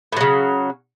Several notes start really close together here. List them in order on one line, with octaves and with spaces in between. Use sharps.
A2 F#3 C#3